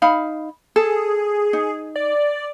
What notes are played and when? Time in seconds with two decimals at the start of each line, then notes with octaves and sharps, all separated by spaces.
0.02 D#4 F5 B5
0.76 G#4 A4
1.53 D#4
1.96 D5